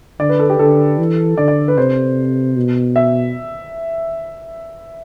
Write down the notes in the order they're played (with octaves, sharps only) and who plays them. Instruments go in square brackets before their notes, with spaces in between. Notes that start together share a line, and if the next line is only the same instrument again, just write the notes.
[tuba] D3 [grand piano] D5
[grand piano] B4
A4
G4
[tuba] D3 [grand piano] A4
[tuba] E3
[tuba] D3 [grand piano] D5
[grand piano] D5
B4
[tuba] C3 [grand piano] C5
[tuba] B2
[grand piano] E5